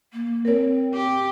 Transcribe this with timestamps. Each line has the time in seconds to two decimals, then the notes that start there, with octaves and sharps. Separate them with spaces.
0.12 A#3
0.45 C4 A#4 C#5
0.94 G4